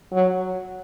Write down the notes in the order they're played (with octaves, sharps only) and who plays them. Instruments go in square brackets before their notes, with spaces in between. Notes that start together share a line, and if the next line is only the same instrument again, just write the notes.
[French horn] F#3